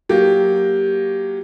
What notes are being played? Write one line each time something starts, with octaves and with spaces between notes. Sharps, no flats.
F#3 A#3 G4